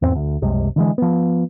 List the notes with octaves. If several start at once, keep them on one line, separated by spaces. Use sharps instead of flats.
E2 G#2 C4
D2
F#1 C2 C3 G#3
D3 E3 G#3
F3 B3